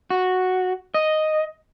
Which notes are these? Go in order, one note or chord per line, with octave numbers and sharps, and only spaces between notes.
F#4
D#5